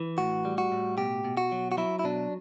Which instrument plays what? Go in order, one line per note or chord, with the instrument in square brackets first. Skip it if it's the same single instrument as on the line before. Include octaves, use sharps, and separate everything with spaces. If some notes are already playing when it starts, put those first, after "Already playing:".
Already playing: [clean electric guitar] E3
A2 F#4
G3
F#4
A2
B2 G4
B2
F#4
F#3
F#4
F#3 E4
E4
B2 D4